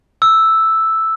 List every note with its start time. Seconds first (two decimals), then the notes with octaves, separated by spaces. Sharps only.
0.22 E6